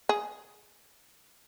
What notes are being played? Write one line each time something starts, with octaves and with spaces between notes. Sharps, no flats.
G#4